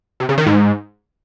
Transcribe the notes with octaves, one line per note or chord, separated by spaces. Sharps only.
C3
C#3
D#3
G#2